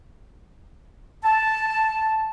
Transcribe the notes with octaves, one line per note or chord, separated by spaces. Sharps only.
A5